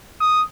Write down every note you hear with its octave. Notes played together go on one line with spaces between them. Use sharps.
D#6